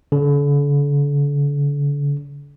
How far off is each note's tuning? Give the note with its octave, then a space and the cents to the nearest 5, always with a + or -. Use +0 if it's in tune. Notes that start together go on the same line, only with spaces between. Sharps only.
D3 -40